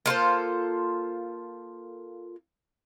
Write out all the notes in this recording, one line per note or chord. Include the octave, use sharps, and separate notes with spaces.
A#3 F4 A4 C5